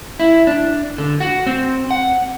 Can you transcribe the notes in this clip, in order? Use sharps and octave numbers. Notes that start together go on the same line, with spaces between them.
E4
D4
D3
F#4
C4
F#5